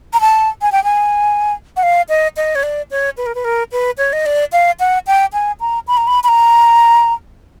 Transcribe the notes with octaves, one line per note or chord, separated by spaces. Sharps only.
A#5
A5
G#5
G5
G#5
F#5
F5
D#5
D#5
C#5
D5
C#5
B4
A#4
B4
A#4
B4
C#5
D#5
D5
F5
F#5
G5
G#5
A#5
B5
A#5
B5
B5
A#5